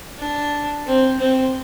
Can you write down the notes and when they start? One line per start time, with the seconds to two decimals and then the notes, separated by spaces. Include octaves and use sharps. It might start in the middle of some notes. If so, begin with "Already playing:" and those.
0.18 D4
0.86 C4
1.20 C4